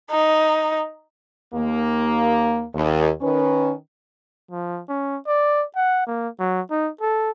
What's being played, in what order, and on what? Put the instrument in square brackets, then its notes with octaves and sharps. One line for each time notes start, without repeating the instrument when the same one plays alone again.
[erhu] D#4
[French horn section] D#2 A#3
D#2
D#3 C#4 B4
[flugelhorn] F3
C#4
D5
F#5
A#3
F#3
D#4
A4